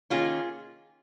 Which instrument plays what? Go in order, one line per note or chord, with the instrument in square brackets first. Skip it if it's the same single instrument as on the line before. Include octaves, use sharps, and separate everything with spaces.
[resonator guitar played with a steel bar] D#3 A#3 C#4 F4 G#4